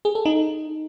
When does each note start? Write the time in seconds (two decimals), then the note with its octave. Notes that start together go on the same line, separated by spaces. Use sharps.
0.05 G#4
0.15 A4
0.25 D#4